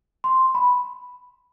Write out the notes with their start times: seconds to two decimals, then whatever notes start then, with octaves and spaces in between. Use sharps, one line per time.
0.24 C6
0.55 B5